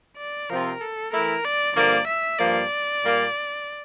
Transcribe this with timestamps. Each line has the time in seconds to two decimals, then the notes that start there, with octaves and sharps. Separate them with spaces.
0.17 D5
0.49 C3 F3 C4 F4 A#4
0.81 A4
1.13 E3 A3 E4 A#4
1.45 D5
1.76 G2 D3 F3 A#3 D5
2.07 E5
2.39 G2 F3 A#3 D5
3.03 A#2 G3 A#3